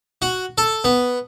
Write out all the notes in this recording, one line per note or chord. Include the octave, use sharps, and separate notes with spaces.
F#4
A4
B3